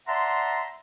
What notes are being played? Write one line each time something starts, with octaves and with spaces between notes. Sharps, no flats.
D5 E5 F#5 A5 A#5 C6